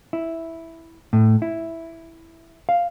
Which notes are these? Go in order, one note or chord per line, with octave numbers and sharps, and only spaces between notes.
E4
A2
E4
F5